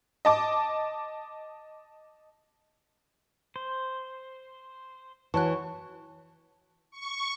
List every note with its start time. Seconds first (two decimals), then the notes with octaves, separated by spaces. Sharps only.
0.25 D#5 A5 D6
3.56 C5
5.34 E3 F#4 C#5 A5 C#6 F#6
6.91 C#6